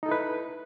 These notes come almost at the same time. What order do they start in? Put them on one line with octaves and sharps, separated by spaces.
D#4 A4 E4 B4